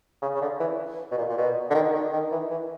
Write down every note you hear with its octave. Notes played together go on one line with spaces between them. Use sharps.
C#3
C#3
D3
E3
B2
A#2
A#2
B2
D3
D#3
D#3
D#3
E3
E3